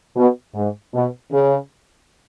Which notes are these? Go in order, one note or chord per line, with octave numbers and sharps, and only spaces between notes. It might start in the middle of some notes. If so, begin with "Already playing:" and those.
B2
G#2
B2
C#3